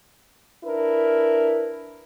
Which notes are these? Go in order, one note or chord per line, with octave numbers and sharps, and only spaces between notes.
D4 E4 A#4 B4